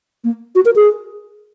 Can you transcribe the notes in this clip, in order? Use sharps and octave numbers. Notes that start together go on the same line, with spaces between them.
A#3
F#4
A#4
G#4